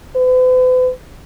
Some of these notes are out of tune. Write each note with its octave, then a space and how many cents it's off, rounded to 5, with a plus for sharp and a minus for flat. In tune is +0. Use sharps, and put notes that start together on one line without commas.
B4 +45